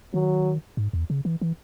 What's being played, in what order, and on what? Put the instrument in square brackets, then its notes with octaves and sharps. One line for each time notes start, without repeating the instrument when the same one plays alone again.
[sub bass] D#3 [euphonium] F#3
[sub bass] G#2
E2
C#3
E3
E3